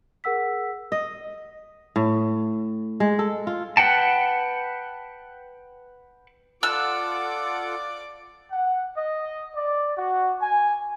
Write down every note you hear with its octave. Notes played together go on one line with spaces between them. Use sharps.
G#4 A#4 F#5 E6 B6
D#5
A2
G#3
A4
F4
B4 F#5 G5 A5
F4 A4 D5 F#5 D6 E6 F#6
F#5
D#5
D5
F#4
G#5